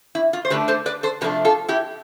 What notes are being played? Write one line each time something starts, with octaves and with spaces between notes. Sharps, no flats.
E4
F4
C5
D3 A3 D4 G4 B4
A4 C5
B4 D5
A4 C5
C3 F3 A3 D4 G4 B4
F4 A4
E4 G4